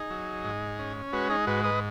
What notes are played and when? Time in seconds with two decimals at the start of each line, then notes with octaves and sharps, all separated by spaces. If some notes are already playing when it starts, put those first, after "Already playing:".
Already playing: D#4 G#4
0.10 F#3
0.44 G#2
0.79 C#4
1.13 G#3 F#4 B4
1.30 D#4 G#4
1.47 G#2 F#4 B4
1.64 B4 D#5